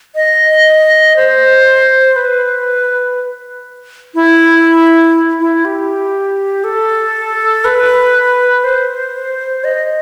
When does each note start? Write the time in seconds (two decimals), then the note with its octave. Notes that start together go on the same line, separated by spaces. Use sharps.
0.15 D#5
1.16 C5
2.16 B4
4.15 E4
5.40 E4
5.65 G4
6.64 A4
7.65 B4
8.64 C5
9.64 D#5